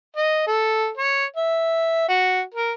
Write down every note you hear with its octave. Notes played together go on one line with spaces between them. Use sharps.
D#5
A4
C#5
E5
F#4
A#4